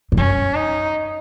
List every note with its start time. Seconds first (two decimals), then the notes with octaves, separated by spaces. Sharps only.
0.12 G#2
0.17 F#2 C#4
0.55 D#4